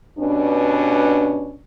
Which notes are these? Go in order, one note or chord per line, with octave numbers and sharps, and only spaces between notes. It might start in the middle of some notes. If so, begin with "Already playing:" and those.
G2 B2 C#4 D4